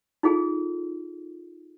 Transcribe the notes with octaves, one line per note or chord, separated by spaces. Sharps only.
D#4 F4 G#4 A4